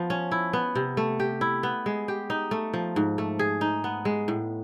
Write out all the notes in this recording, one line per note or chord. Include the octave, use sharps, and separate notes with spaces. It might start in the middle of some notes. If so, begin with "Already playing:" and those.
Already playing: F3 B3
C#4
E4
B3
C3
A3
G4
E4
B3
G#3
G4
D#4
A3
F3
G#2
A3
G#4
D#4
B3
G#3
A2